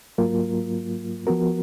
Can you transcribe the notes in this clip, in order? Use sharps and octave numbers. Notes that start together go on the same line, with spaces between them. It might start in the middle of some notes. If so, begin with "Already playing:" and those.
G#2 F#3 A#3 F4 A#4
F3 B3 F#4 A#4